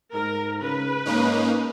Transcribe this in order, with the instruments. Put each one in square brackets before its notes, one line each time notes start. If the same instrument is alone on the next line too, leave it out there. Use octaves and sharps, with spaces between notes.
[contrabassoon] G#2 [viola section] A#4
[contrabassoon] C#3 [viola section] B4
[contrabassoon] G#2 [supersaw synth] A#3 C#4 D#4